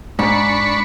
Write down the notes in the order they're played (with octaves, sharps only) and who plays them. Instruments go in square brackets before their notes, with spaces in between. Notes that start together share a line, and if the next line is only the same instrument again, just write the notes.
[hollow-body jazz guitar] G#2 [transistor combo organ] D4 B5 C#6